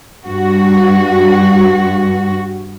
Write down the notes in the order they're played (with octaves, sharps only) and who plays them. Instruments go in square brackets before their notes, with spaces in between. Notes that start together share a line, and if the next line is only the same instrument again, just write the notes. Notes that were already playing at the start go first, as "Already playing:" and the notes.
[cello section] G2 F#4